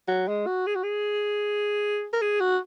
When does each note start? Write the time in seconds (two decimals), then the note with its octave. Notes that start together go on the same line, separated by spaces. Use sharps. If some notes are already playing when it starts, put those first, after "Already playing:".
0.08 F#3
0.28 G#3
0.46 F#4
0.67 G#4
0.75 F#4
0.83 G#4
2.13 A#4
2.22 G#4
2.40 F#4